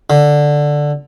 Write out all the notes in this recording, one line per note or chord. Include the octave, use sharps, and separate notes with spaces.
D3